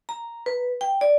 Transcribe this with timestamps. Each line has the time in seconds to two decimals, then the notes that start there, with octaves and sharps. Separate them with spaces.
0.09 A#5
0.46 B4
0.81 G5
1.01 D5